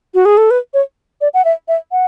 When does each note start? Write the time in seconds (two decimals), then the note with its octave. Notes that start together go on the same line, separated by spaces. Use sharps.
0.14 F#4
0.25 G#4
0.37 A4
0.51 B4
0.74 C#5
1.21 D5
1.34 F#5
1.45 E5
1.68 E5
1.92 F#5